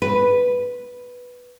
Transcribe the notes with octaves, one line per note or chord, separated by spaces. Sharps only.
B4